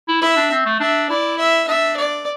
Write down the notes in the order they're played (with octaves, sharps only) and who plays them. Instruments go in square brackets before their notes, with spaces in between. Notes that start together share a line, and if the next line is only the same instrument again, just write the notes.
[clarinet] E4
[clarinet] E4 [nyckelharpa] E5
[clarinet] D4
C4
A3
[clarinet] D4 [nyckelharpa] E5
[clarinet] E4 [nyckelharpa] D5
[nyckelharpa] E5
[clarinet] D4 [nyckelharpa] E5
[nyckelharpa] D5